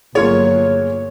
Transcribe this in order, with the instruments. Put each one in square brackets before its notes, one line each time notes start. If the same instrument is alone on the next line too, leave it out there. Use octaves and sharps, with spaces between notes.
[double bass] G1 F#3 [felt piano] A#3 F4 G#4 [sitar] C#5